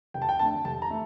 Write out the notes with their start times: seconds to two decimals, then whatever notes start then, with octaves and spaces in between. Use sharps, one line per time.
0.14 F1 G5
0.22 A5
0.29 G5
0.39 F2 D3 A3 A5
0.65 F1 A5
0.82 A#5
0.91 A3